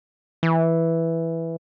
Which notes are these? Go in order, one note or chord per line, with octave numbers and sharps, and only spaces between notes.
E3